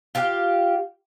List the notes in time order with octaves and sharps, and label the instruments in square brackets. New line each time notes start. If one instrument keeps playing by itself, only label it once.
[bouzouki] F4 G4 F5